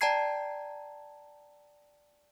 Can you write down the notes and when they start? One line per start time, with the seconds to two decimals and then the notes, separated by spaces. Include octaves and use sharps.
0.01 D5 G5 A5 A#5 G#6 C7